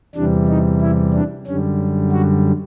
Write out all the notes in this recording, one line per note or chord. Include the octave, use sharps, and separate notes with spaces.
E2 C3 E3 G3 D4
D#4
E4
D4
F#2 D3 G3 C#4
F#4